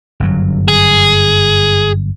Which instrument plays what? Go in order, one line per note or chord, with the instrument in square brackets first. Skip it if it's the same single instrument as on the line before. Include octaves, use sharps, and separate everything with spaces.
[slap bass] G1 F#2 F#3
[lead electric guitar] G#4